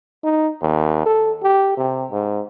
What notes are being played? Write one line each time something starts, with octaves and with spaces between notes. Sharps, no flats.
D#4
D#2
A4
G4
C3
G#2